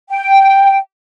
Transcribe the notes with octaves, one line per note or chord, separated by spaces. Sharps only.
G5